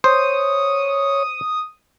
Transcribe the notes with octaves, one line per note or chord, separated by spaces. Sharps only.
C5 C#5 D#6